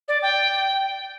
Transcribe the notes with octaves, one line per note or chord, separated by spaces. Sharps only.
D5
G5